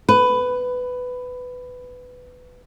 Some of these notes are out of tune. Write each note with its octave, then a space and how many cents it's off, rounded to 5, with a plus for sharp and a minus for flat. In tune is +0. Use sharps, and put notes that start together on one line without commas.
B4 +15